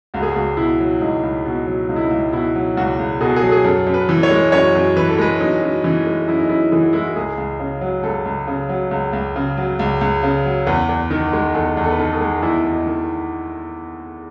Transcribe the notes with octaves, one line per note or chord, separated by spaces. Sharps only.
C#2 F#4
G#4
C#2 F#4
B2 E4
F#3
C#2 D#4
C#2
B2
F#3
C#2 D#4
E4
D#4
C#2
B2 E4
F#3
C#2 F#4
C#2
B2 G#4
A4
G#4
F#3 A4
G#4
F#2 A4
F#2
B4
E3
C#5
G#3
F#2 C#5
F#2
E3 B4
A4
G#3 B4
F#2 D#4
F#2
E3 C#4
G#3
F#2 E4
D#4
F#2 E4
E3 G#4
F#4
G#3 E4
F#4
C#2 G#4
C#2
C#3
F#3
C#2 A4
C#2
C#3
F#3
C#2
C#2
C#3
F#3
C#2
C#2
C#3
F#3
E2 B4
E2
D#3
G#3
E2 A4
E2
A4
B4
D#3 A4
G#4
G#3
E2 E4
E2
D#4
D#3